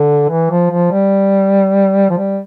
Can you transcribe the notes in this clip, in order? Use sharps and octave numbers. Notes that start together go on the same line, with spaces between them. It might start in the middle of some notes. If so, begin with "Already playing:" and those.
Already playing: D3
E3
F3
F3
G3
F3
G3